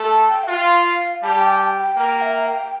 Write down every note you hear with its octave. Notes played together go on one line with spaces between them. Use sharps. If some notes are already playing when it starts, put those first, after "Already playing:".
Already playing: A3 A4
A5
G5
E5
F4 F5
G3 G4 A5
G5
A5
G5
G5
A#3 A#4 G5
E5
G5